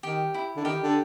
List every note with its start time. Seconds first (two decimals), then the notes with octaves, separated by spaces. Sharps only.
0.03 D#3 G4
0.34 E4
0.56 D3
0.64 D#3 G4
0.83 D3